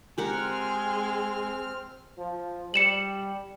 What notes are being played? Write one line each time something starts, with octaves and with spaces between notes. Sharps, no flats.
G#3 C4 G4 A#4 F#5 F6
F3
G3 C#7 E7 F#7